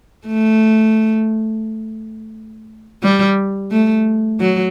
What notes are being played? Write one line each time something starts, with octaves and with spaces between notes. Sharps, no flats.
A3
G3
A3
F#3